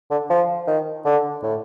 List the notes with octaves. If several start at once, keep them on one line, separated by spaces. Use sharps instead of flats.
D3
F3
D#3
D3
A2